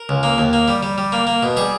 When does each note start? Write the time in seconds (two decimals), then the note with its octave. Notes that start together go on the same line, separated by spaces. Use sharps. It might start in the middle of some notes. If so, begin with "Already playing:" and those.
Already playing: A#4
0.09 C#2
0.23 A#3
0.38 D#2
0.53 A#3
0.68 G3
0.83 G3
0.98 G3
1.12 A#3
1.27 A#3
1.43 B2
1.57 G3 G#4